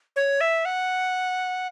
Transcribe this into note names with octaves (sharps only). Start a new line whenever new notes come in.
C#5
E5
F#5